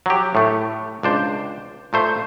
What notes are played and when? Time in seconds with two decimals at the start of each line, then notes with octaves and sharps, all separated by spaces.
0.06 F#3 G4
0.35 A2 A3
1.03 C#2 D4 C5
1.93 A#2 A3 C5